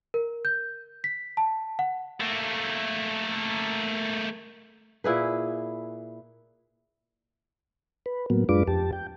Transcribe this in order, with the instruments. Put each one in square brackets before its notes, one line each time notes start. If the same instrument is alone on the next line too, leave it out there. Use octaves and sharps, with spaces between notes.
[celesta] A#4
G6
B6
A5
F#5
[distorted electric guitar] A3 A#3
[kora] A#2 E4 G#4 B4
[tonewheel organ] B4
A2 F#3 A#3 B3
F#2 G#3 D4 F4 B4 D6
F2 G4 A5
G5